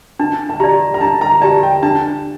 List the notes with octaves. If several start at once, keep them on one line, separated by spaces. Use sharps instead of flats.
D4 A5
A5
G4 D5 A#5
A#5
D4 A5
A#5
G4 D5 A5
G5
D4 A5